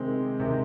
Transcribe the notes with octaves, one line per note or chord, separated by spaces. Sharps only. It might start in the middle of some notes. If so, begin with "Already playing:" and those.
Already playing: C3 D#3 G#3 C4
C3 D#3 G#3 C4